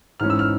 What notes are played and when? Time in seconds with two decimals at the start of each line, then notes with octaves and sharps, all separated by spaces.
0.20 G#2 E3 G#3 C#4 F6
0.30 E6
0.39 F6